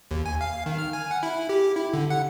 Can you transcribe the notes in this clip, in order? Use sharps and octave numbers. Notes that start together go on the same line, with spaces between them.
D#2
G#5
F5
D#3
F6
G#5
F#5
E4
G4
E4
D3
F#5